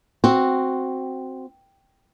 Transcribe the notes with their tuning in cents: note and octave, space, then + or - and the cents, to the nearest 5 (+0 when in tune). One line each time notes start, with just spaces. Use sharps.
C4 +0 F#4 +0